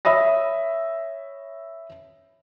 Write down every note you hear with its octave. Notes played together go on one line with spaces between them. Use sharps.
C#5 E5 B5 D#6 A#6